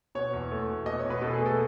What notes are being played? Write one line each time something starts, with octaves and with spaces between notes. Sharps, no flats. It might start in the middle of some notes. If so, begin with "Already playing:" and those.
B2 C#5
E2
A3
B2
B2 D#5
C#5
B2
B4
B2 A4
G#4
A3
A4